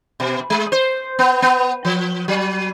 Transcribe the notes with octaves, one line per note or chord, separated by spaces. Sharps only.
B2
G#3
C5
B3
B3
F3
F#3